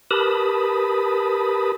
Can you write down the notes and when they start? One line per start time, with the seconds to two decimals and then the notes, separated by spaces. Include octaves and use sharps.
0.11 G4 A#4 B4 A5 B5 D#6